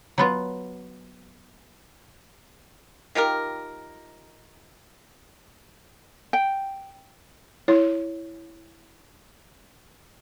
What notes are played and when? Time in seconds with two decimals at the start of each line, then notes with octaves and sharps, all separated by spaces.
0.18 F#3 B3 F4
3.15 D#3 F4 G4 A#4
6.33 G5
7.68 E4 C#5